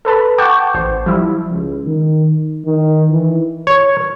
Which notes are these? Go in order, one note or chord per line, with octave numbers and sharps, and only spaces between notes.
A4 B4 A5 B5
F#5 G5 A5 C#6 D6 G6
A1 C5
F3 G3 E4
C#2
D#3
D#3
E3
C#5